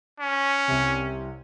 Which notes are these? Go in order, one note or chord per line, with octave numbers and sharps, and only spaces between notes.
C#4
C2 C3